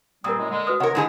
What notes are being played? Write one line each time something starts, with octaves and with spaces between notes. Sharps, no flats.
A#2 G3 C4 A#4 D#6
F#2 A2 G#3
D3 G#3
F#4 B4 D#6
C3 A#4 C#5 D#5 F#5
G#2 D3 G#3 E4 G#4